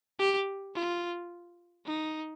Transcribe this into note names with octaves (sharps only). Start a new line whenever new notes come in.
G4
F4
D#4